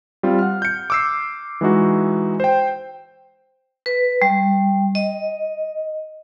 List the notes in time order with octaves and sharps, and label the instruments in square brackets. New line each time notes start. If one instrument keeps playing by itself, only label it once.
[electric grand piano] G3 C4 F4
F#5 F6
G6 C#7
D6 E6 C7
E3 G#3 D#4 F#4
C5 G5
[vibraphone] B4
G3
D#5